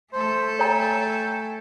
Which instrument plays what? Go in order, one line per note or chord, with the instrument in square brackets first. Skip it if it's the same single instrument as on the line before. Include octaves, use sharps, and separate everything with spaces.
[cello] A3 A4 [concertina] C5
[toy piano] C#5 A#5 [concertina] G5 G#5